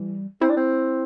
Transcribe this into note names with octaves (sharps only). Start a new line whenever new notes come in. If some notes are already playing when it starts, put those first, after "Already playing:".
Already playing: E3 G3
C4 E4
D4
C4